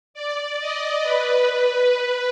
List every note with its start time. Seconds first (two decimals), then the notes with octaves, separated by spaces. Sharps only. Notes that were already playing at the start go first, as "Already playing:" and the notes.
0.14 D5
0.60 D#5
1.03 B4